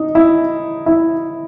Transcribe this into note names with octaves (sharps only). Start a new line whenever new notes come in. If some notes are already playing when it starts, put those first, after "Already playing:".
Already playing: D#4
E4
E4